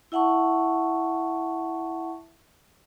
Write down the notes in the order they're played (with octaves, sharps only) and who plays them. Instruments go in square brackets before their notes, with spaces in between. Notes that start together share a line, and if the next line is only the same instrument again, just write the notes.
[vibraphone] E4 E5 F#5 A5 C#6